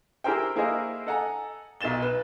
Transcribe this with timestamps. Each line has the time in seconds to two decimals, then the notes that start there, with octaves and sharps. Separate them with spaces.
0.24 E4 G4 G#4 A#4 C5 G5
0.56 A#3 E4 G#4 A#4 C5 D#5
1.07 A4 D#5 F#5 G#5 A#5
1.81 B1 B2 A6 E7 G7
2.02 B4